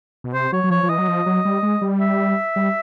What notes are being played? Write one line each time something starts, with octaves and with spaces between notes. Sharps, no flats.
B2
C3 C5
F#3 C#5
F#3
F3 C#5
F3
E3 D#5
F#3
F3
F#3
G3
G#3
G3
E5
G3